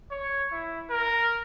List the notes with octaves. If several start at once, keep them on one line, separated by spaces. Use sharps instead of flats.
C#5
E4
A#4